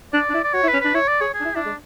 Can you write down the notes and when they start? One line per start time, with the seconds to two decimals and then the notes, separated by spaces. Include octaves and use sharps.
0.13 D4 D5
0.30 D4
0.34 E4
0.44 D5
0.54 F#4 C#5
0.63 E4
0.68 B4
0.73 C#4
0.81 D4 B4
0.94 E4 C#5
1.08 D5
1.21 G#4 C#5
1.34 G#4
1.40 D4
1.45 E4
1.55 D4 E4
1.66 G#3